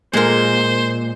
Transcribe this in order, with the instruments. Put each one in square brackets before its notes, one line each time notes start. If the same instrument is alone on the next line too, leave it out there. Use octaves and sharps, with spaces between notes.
[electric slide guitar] A#2 [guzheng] G#3 A#4 [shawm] C5